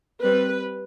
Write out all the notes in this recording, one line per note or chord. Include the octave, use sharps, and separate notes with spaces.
G3 C4 B4